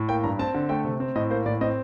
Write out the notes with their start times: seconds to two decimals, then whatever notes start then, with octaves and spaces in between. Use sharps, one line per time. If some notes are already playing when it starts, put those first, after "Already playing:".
Already playing: A2
0.09 A#3 G5
0.24 G2 A#5
0.39 C4 A5
0.54 D3
0.69 A3 G5
0.84 C3
1.00 C4
1.15 A2 D#5
1.30 A#3 C5
1.46 A2 D5
1.61 C4 D#5